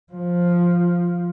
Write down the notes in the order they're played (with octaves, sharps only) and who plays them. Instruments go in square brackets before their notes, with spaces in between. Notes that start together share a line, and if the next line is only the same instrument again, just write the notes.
[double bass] F3